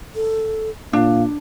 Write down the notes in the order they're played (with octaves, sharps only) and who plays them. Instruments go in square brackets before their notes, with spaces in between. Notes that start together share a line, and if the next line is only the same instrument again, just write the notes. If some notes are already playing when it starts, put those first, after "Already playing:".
[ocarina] A4
[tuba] A#2 [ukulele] D4 [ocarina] F5